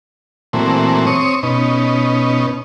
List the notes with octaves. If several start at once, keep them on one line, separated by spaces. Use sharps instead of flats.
A#2 E3 F#3 A3 C4
C4 C#5 C#6 D#6
B2 C#4 D#4